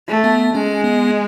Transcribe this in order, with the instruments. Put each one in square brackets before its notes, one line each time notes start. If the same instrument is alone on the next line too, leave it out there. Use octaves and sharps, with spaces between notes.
[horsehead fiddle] A3
[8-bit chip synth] B3
[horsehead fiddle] G#3 [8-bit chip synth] C#4
[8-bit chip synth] B3